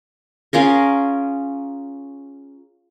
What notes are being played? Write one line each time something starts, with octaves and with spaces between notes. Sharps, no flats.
C#4 F4 G#4 A#4